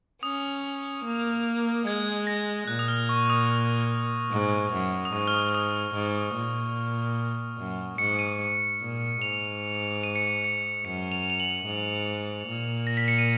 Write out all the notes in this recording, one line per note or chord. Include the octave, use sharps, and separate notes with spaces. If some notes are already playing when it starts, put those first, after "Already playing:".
C#4 D#6
A#3
G#3 G#6
A#6
A#2 F#6
D#6
F6
C#6
D#6
G#2
F#2
D#6
G#2 C#6
F6
D#6
F6
D#6
G#2
A#2
F#2
G#2 C#7
D#7
A#2
G#2 F7
D#7
C#7
D#7
C#7
F#2 C#7
F7
F7
F#7
G#2
A#2
A#6
B6
C#7
D#7